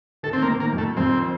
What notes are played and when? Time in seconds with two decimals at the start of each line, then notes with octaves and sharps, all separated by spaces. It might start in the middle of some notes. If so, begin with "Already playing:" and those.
0.23 D#3 A4
0.33 C4
0.42 A#3
0.48 D#3
0.60 A#3
0.73 F2
0.78 A3
0.97 F2 C4